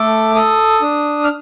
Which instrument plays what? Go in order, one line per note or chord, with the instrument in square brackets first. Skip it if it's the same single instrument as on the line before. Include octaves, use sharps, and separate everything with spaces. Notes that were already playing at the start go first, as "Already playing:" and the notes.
Already playing: [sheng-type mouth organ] A3 A4 D6
A4 D#6
D4
F6